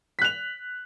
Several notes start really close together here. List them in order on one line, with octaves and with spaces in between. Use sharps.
B6 F#6 F7